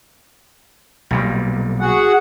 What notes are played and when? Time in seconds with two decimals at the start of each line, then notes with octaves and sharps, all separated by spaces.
1.11 B1 A#2 G3
1.80 F#4 G#4 F#5